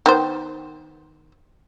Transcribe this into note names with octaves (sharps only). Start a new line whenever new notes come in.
D#3 B3 C5